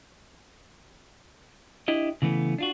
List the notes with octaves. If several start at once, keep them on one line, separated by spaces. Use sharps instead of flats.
D4 E4 G4 D#5
C#3 E3 A3 B3
D4 F4 F#4